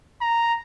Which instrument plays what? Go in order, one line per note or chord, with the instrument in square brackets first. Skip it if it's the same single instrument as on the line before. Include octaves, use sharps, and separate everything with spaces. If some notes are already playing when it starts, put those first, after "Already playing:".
[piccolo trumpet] A#5